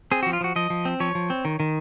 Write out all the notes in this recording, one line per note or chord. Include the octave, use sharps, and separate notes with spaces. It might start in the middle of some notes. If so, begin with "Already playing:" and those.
C4 G#4
F3 F#4
F4
F3 F#4
F3 D#5
F3
C4
F3 C#5
F3
C4
D#3
D#3